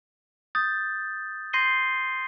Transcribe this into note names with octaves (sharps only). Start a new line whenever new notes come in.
D#6 G6 A6
C6 G6 A#6 C7 D#7 G7